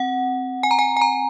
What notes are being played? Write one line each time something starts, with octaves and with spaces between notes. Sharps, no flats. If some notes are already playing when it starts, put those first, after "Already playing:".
Already playing: C4 F#5
G#5
A#5
G#5
G#5
A#5